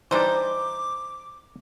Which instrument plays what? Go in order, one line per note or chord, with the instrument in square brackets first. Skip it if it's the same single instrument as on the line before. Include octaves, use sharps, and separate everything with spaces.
[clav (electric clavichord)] E3 G3 D4 [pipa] D#4 C5 [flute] D6